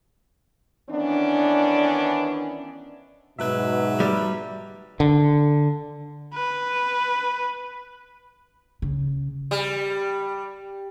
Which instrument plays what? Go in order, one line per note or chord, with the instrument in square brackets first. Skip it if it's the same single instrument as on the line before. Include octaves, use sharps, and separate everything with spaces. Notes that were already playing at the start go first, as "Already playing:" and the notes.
[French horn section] D#3 E3 B3 C#4 D4
[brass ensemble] G#2 B2 [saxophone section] F#3 B4 E5
[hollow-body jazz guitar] G3
[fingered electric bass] D3
[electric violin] B4
[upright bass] C#3
[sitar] G3